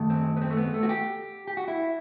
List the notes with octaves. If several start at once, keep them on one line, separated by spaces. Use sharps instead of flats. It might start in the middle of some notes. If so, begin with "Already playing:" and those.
Already playing: F#2 D#3 A3
C4
B3
C4
A3
B3
A3
F#4
G4
G4
F#4
E4